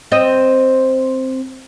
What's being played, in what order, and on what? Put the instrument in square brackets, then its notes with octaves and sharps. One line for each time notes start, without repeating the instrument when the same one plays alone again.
[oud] C4 D#5